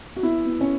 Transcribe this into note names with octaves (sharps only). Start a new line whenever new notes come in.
F#4
B3 E4
B3
C#4